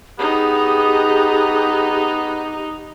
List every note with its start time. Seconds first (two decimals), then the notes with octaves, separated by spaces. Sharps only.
0.19 B3 D#4 G4 G#4